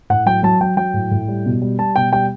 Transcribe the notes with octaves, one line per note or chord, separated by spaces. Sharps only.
A2 F#5
F#3 G5
F#3 A5
F#3 G5
F#3 G5
A2
A2
G3
B2
G3
G3 A5
B2 G5
G3 G5